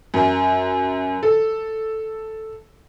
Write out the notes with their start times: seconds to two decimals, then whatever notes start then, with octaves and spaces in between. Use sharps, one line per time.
0.14 F#2
1.23 A4